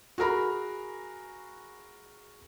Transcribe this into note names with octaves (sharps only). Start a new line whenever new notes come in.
F#4 G#4 A#4 A#5 B5